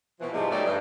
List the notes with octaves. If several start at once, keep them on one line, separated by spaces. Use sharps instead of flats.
B2 E3 F3
G#2 C3 F3 G3 G#3
D#3 F#3 G3 A3 D#4 D5
G2